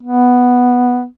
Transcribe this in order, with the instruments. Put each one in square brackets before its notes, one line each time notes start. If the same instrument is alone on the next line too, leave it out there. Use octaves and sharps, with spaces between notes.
[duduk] B3